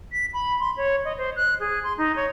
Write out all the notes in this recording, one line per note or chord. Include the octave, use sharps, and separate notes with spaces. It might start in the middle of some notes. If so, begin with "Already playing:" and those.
B6
B5
C6
C#5
D#5
C5
F#6
G#4
C6
D#4
C#5